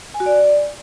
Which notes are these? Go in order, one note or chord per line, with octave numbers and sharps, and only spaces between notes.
G#5
F#4
D5